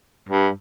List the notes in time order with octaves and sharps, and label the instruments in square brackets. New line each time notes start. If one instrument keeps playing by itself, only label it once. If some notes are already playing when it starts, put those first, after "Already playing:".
[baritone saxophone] G2